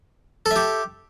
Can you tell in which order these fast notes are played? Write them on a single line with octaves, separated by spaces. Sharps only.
A4 E5 G4